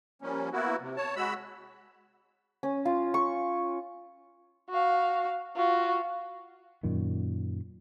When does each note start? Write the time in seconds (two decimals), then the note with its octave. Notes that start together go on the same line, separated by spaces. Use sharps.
0.22 F3 G3 A#3 C#4
0.52 A#3 B3 E4 F#4
0.80 C3
0.97 C#5 A5
1.16 G#3 F#4 B5 E6
2.63 C#4
2.85 F4
3.14 C#6
4.70 F#4 F5
5.56 F4 F#4
6.83 F#2 A#2 D#3